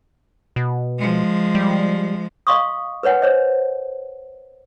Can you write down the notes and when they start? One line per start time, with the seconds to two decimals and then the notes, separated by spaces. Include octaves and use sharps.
0.56 B2
0.99 F3 G#3
1.55 G3
2.47 D#5 F5 C6 C#6 D#6
3.03 A#4 B4 C#5 F#5 G#5
3.22 C5 C#5 D#5